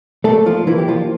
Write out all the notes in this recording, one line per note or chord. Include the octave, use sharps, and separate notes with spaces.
A3 A#3 A4
F3 F4
E3 A#3 E4
G4
F3 F4